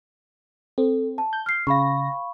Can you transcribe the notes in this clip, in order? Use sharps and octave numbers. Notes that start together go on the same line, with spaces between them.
C4 A4
A5
G6
F6 C7
C#3 F5 B5 C#6 A#6